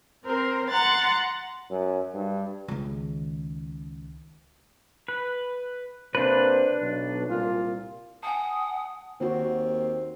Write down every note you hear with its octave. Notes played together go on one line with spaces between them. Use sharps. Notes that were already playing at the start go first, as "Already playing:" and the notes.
C4 A#4 C5
F#5 A#5 C6 F#6 A6
F#2
G2
C#2 D#3
B4
C3 A#3 D4 B4 C5
B1
C2 A#2 F4
F#5 G#5 A5 D#6
D#2 D#3 C4 F#4